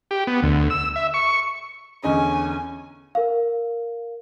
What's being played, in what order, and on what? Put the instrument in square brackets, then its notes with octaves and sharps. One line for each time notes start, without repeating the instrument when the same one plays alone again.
[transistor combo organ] G4
B3
D2
E6
E5
C#6
[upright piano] E2 D3 D#5 [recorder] C#4 [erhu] G#5
[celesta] A#4 F5